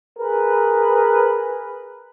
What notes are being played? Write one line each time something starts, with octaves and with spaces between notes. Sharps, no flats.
G#4 A#4 B4